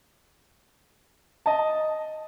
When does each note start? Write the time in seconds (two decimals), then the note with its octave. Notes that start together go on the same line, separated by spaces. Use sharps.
1.46 D#5 A5